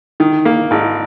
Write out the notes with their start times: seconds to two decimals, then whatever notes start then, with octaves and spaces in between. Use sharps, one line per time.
0.20 D#3
0.45 A#3
0.71 G#1